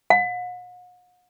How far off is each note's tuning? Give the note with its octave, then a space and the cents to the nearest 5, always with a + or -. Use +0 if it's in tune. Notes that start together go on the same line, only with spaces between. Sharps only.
F#5 -45